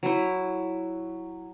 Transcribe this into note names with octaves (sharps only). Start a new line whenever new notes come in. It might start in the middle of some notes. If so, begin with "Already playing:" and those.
F#3 E4